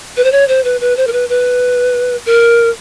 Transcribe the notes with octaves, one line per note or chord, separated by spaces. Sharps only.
B4
C5
C#5
C5
B4
B4
C5
A#4
B4
B4
A#4